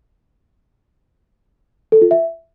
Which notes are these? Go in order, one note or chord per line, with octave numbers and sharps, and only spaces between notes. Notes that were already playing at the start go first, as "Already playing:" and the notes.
A4
F4
E5